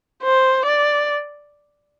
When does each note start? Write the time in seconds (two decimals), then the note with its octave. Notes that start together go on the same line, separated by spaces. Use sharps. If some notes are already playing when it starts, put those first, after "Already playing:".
0.23 C5
0.66 D5